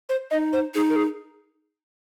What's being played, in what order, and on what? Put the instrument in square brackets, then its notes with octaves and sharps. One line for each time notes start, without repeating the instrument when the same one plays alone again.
[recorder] C5
[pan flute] D#4 [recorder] D#5
[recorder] C5
[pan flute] D#4 [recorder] G#4
[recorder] A#4
G#4